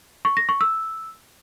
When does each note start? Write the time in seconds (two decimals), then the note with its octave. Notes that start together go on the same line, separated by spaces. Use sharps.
0.25 C#6
0.37 A#6
0.49 C#6
0.61 E6